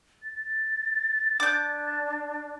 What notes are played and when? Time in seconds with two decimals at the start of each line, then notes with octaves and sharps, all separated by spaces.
0.23 A6
1.40 D4 D6 G6